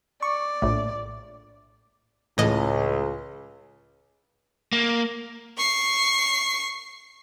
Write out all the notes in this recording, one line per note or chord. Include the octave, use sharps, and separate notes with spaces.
D5 C#6
A#1 A2
C#2 A2 E3 D#5
A#3
C#6 C7